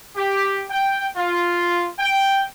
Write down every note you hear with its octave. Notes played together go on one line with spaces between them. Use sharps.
G4
G5
F4
G5